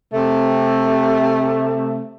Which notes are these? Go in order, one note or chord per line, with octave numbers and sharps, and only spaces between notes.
C3 A3